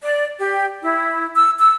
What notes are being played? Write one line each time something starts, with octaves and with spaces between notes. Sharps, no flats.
D5
G4
E4
E6
E6